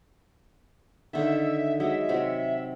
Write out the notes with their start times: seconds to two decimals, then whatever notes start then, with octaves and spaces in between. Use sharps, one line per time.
1.13 D3 D#3 E5
1.55 E5
1.80 F#3 G#3 E5
2.09 C3 F#3 C4